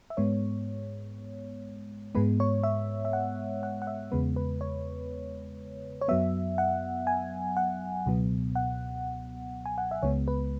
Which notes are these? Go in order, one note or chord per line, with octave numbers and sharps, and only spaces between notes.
E5
G#2 G#3 B3 C#5
G#2 G#3 B3 B4
C#5
E5
E5
F#5
F#5
F#5
E5
E2 C#3 G#3 B3 B4
B4
C#5
C#5
F#2 F#3 B3 E5
F#5
G#5
F#5
C#2 B2 F#3 B3
F#5
G#5
F#5
E5
C#2 C#3 G#3 B3 C#5
B4